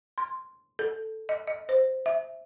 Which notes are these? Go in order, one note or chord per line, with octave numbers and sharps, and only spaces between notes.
C6
A4
D#5
D#5
C5
E5